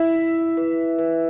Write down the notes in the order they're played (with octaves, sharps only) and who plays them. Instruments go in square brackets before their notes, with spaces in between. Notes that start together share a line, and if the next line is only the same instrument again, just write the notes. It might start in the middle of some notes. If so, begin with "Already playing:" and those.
Already playing: [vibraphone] E4 [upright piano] E5
[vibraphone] E4
B4
B4